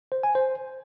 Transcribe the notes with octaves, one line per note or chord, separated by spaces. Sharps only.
C5
G#5
C5